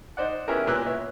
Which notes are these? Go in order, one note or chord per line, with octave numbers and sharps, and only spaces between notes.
D#4 C5 D5 F#5
B3 C#4 E4 G4 G#4 A#4
A#2 B3 E6 F#6
B3 C#5 E5